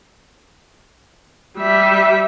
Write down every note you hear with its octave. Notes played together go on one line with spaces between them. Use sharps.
G3 E5